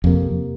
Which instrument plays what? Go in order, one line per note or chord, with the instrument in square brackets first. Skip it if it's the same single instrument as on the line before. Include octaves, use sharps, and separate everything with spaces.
[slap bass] F2 [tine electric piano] C3 A#3 G4 A#4